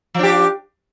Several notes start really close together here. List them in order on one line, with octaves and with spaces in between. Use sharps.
F3 D4 G4